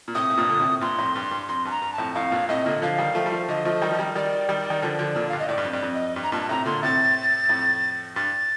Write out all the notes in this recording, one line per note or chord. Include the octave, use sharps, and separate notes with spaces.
A#2
A2 C3 D#6
A2
G2 A#2
D3
A2 C3
G2 A#2 C6
F2 A2
G2
G2
F2 C6
G2 A5
A#5
G2
A5
F2 A2
F2 A2 F5
G2 A#2
A2 C3 D#5
A#2 D3
D3 F3 F5
D#3 G3
F3 A3
G3
F3 A3
D3 F3 D#5
F3 A3
D#3 G3
F3
D#3 G3
D#3 G3 D5
D#3 G3
D#3
D3 F3
D3 F3
A#2 D3
G2 F5
D#5
A2 D5
G2
F2
G2 D5
F2
D#5
G2
A#5
G2 A#2 A5
A5
A2 C3 A#5
A#2 D3 C6
A2 C3 A6
F2 A2
G2 A6